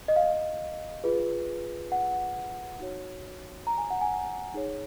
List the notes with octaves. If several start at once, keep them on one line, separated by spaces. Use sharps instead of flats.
D#5
F5
F4 G#4 B4
F#5
D#4 F#4 C#5
A#5
G#5
F#5
G#5
D#4 G#4 C#5